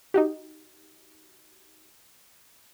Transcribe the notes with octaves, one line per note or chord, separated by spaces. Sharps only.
D#4 F#4 G4